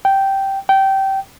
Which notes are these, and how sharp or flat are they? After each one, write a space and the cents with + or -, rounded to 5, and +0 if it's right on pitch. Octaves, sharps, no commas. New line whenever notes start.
G5 -10
G5 -20